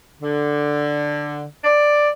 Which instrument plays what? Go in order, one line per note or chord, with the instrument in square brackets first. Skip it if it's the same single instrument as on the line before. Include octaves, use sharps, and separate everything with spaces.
[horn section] D3
D5